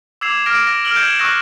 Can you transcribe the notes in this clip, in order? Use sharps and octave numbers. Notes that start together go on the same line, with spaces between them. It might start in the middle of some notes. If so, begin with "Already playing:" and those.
D6 E6 G#6 C7 E7 F7
D6 E6 F6 A#6 D7
A#6
F6 D7 F#7 G7
G6 G#6 A#6 C#7 E7
C#6 D#6 E6 F#6 A#6